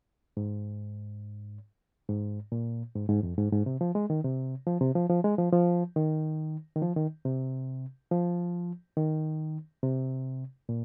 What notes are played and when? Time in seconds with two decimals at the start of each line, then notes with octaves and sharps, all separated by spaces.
0.37 G#2
2.09 G#2
2.52 A#2
2.95 G#2
3.09 G#2
3.23 F2
3.38 G#2
3.52 G#2
3.66 C3
3.81 F3
3.95 G#3
4.10 D#3
4.24 C3
4.67 F3
4.81 C3
4.95 F3
5.10 F3
5.24 G#3
5.38 F3
5.53 F3
5.96 D#3
6.76 D#3
6.82 F3
6.96 D#3
7.25 C3
8.11 F3
8.97 D#3
9.83 C3
10.69 A#2